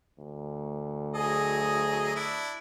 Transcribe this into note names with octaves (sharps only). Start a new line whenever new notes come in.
D2
F#3 G#4 D#5
D4 E4